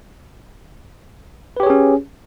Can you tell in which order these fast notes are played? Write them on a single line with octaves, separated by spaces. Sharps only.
B4 G4 C#5 G#4 C#4